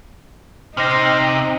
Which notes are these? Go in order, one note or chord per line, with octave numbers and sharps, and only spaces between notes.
C3 D#4 C5 F6 A#6